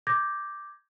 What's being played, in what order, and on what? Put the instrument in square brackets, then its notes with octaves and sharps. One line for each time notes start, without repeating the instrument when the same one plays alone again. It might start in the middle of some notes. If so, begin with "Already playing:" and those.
[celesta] D6 G6 G#6 A#6